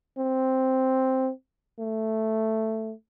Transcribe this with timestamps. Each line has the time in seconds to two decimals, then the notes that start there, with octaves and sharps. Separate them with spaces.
0.18 C4
1.79 A3